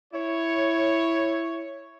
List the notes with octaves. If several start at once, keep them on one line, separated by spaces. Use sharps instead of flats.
E4 C#5